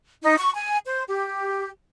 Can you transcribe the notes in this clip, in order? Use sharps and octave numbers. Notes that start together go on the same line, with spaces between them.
D#4
C#6
G#5
C5
G4